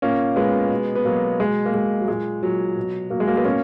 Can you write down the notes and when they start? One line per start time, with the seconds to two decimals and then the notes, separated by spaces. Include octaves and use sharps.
0.02 A#2 A#3 C#4
0.36 A#2 G#3 B3
0.71 B2
0.95 B3
1.05 B2 F#3 A#3
1.39 B2 G#3
1.66 A#3
1.74 B2 G#3
2.01 F#3
2.08 A#2 G#3
2.42 A#2 F#3
2.77 B2
3.10 B2 F#3 A#3
3.20 G#3
3.28 F#3 A#3
3.36 G#3 B3
3.45 B2 A#3 C#4